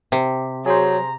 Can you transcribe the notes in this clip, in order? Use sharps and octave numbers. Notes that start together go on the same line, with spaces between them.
C3
F#3 G#4 C5 A#5